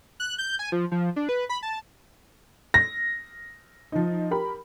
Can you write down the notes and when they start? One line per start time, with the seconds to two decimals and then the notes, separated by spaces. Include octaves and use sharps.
0.20 F#6
0.38 G6
0.59 G#5
0.72 F3
0.92 F3
1.16 D4
1.29 B4
1.49 B5
1.63 A5
2.74 A#6
3.92 F3 D#4
4.31 G4 A#4 B5